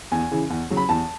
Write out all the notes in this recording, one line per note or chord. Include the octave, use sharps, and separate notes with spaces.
E2 G#5
C#3 E3
E2
C#3 F#3
B5
E2 A5